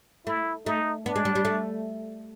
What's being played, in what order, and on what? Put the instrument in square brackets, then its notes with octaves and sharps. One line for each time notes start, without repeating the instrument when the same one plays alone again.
[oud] A3 [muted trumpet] E4
[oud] A3 [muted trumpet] D#4
[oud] B3 [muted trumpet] D4
[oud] G#3
G3
G3
A3